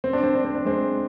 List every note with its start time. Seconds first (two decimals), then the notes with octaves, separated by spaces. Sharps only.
0.04 C4
0.13 D4
0.24 C4
0.35 D4
0.45 C4
0.55 D4
0.65 G#3 C4